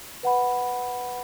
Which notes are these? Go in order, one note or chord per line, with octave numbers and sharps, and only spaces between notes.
B4 F#5 B5